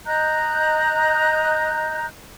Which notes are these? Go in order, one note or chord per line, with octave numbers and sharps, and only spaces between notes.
D#5 A#5 F#6 G6